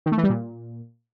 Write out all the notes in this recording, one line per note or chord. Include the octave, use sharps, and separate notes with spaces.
D#3
A3
E3
G3
A#2